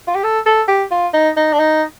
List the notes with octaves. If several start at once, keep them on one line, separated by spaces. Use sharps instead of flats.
F4
G4
A4
A4
G4
F4
D#4
D#4
D4
D#4